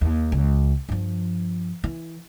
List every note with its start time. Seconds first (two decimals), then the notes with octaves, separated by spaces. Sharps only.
0.01 D#2
0.32 C#2
0.89 G2 F3
1.84 E3